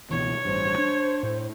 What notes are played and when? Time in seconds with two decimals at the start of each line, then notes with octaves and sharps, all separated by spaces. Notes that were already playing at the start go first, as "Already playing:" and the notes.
0.11 C#2 B2 E3 C#5
0.45 A1 G2 C5
0.78 D4
1.23 A2